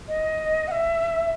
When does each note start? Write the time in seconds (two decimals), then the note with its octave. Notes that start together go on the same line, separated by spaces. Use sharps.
0.08 D#5
0.68 F#5
0.71 E5